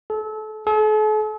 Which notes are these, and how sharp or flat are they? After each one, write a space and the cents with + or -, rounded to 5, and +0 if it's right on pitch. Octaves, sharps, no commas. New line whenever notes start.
A4 -30
A4 -45